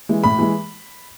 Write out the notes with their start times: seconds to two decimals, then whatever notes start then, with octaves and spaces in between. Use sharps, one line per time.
0.09 E3 G#3
0.24 A2 B5
0.39 E3 G#3